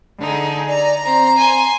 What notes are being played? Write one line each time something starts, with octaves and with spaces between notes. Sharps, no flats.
D3 D#4 G#4
D5 A#5
C4 A#5
G#5 C6